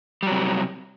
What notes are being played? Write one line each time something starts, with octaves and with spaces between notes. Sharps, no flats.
C3 F#3 G3